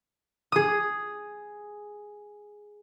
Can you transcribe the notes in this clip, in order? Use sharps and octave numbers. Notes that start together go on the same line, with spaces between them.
G#4 D#6